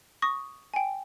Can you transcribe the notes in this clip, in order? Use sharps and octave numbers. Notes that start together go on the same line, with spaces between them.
C#6 D#6 A#6
G5 G#5